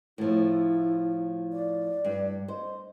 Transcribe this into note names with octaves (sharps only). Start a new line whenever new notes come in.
A2 F3 E4
D5
G2
C5 D#5